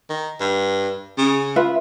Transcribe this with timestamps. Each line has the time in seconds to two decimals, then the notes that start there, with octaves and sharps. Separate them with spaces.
0.10 D#3
0.40 G2
1.18 C#3
1.56 F4 B4 E5